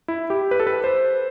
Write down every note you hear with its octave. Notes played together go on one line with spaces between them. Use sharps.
E4
G4
B4
A4
B4
C5